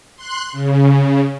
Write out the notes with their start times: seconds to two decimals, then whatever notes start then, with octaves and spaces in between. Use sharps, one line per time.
0.16 C6 F#6
0.52 C#3